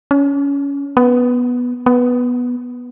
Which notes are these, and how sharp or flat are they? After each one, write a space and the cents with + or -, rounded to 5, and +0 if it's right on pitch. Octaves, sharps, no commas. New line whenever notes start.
C#4 +20
B3 -5
B3 -5